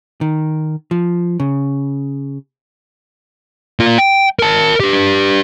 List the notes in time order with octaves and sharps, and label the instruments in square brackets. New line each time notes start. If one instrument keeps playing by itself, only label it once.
[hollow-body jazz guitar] D#3
F3
C#3
[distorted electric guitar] A#3 F4
G5
A#4 A5
D4 G4